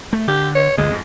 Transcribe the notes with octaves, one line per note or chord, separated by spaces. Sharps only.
A3
D3 G4
C#5
G1 D2 G2 G#3
F2 G#2